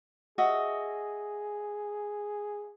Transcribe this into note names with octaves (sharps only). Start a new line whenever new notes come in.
F#4 G#4 D#5 E5